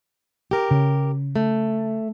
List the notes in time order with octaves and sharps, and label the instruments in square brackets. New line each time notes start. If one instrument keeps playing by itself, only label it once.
[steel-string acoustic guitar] G4 A#4
[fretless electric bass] C#3
[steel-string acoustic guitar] A3